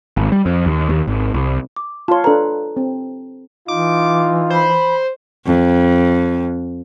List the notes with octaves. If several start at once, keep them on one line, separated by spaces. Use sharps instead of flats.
G#1
G3
F2
D#2
D#2
G#1
C2
D6
F4 C#5 A5 C6
D4 A4 B4 A#5
C4
E3 D#4 F4 D6
C5 B5
F2